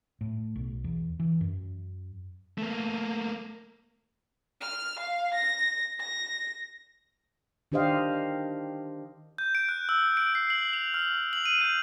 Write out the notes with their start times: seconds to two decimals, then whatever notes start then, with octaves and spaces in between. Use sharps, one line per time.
0.21 A2
0.56 B1
0.84 E2
1.20 E3
1.41 F#2
2.58 A3 A#3
4.61 F6
5.00 F5
5.35 A#6
6.00 A#6
7.72 D#3 D4 G4 C5 D#5 F5
9.38 G6
9.55 D7
9.69 F#6
9.89 E6
10.17 D7
10.35 C7
10.50 F#7
10.73 F7
10.94 F6
11.33 F#7
11.45 D#7
11.61 G6